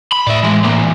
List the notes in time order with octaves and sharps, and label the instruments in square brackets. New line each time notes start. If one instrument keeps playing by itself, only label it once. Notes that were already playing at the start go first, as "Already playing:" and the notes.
[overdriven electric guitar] B5
[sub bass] A2 [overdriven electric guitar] D5 E5
[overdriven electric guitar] E3 G#3
E3 A#3